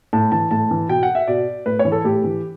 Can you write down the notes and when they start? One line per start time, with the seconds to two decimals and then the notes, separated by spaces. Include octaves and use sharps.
0.13 A2 A5
0.32 E3 A5
0.51 A2 A5
0.71 E3
0.89 B2 G5
1.03 F#5
1.15 E5
1.27 B2 D5
1.66 A2 B4
1.79 C#5
1.85 E3
1.92 A4
2.04 A2 G4
2.24 E3